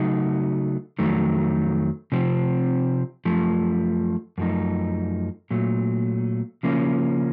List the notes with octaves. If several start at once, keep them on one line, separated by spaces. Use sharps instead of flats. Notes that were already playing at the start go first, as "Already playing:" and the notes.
Already playing: C#3 F#3 A3 D#4 F#4
F2 D#3 F#3 A3
C3 F3 C4
F#2 F3 A3
F#2 F3 A3 D#4
A#2 F#3 A3
C#3 F3 A#3 C#4